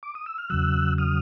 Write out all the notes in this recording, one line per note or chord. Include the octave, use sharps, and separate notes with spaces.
D6
D#6
E6
F6
E2 C#3 F#3 E6 F#6
D#6 F6